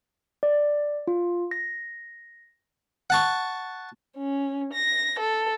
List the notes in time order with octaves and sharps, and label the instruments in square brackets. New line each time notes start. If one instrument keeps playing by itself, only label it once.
[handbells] D5
F4
A#6
[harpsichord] F#5 A5 C#6
[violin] C#4
A#6
A4